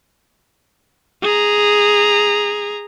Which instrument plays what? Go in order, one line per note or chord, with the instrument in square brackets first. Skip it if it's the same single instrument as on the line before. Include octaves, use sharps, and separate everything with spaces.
[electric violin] G#4 A#5